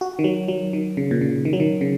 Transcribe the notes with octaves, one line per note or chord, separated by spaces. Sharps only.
F#4
D#3
F#3
F#3
D#3
C#3
A#2
C#3
D#3
F#3
D#3
C#3